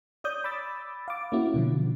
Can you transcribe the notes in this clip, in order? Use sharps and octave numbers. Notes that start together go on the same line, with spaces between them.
C#5 D5 D#6 G6
B5 D6 E6 A6
F5 D6
A#3 C#4 E4 F#4
B2 D3 F3